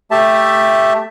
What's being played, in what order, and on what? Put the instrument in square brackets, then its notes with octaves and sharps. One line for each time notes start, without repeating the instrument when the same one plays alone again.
[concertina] A3 G4 E5 A5